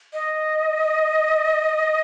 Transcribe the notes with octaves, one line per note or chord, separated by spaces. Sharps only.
D#5